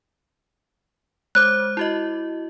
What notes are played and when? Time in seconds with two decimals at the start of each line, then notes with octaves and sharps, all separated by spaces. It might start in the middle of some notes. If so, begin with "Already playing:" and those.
1.35 G#3 C5 D6 F#6
1.77 E4 F#4 D#5